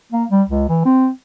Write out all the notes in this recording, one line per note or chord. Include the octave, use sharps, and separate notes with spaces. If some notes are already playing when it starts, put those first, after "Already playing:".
A#3
G3
C#2
E3
C4